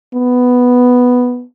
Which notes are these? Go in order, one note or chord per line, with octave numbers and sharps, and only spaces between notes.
B3